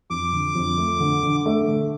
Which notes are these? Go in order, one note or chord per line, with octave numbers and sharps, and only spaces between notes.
F2 D6
D3
F2
A3
D3
D3
A3
D3